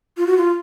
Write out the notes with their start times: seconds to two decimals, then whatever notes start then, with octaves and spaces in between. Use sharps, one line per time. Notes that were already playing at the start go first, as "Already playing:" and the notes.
0.17 F4
0.27 F#4
0.37 F4